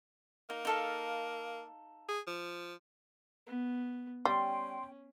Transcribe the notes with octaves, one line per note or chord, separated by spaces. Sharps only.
A#3 D#4
D#4 A4 F5
G#4
F3
B3
G3 C#4 G5 C6